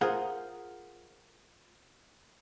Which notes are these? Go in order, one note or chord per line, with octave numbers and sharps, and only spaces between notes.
F4 G#4 A#4 C5 F#5